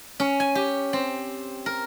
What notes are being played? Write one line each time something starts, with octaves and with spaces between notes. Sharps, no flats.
C#4
G#5
G4
C4
A#4